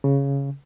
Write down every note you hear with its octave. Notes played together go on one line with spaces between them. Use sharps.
C#3